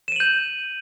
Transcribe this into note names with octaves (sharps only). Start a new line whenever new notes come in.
G6 D#7 E7 F#7